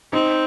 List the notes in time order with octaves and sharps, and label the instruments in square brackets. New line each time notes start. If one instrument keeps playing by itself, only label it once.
[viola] C4 [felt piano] D#4